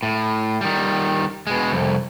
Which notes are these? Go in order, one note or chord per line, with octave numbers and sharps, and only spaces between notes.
A2
D#3 G3
B2 G#3
C2 F2